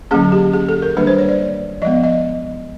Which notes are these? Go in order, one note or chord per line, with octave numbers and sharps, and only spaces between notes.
D3 F#3 A#3 C#4 G#4
G4
G#4
A4
A#4
D#3 G3 A#3 D4 B4
C5
C#5
D5
F3 G#3 B3 D#5
D#5